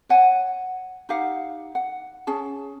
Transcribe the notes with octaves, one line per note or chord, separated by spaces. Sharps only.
C#5 F#5 G#5
D#4 G4 F5 F#5
F#5
C#4 G#4 A5